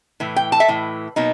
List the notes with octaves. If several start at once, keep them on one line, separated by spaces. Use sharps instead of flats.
A2 E3
G5
A5
E5
A2 E3
B2 F#3 A#3 D#4